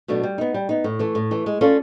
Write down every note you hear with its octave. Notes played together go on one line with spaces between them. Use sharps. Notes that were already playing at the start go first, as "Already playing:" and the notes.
B2 F#3 A3 D4
G3
B3 D#4
G3
B3 D#4
A2
E3 A3
A2
E3 A3
G#3
C#4 F4 A4 D5